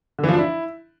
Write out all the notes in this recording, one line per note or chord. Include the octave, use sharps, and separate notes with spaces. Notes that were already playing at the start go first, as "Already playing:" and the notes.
D3
E3
F3
D4
E4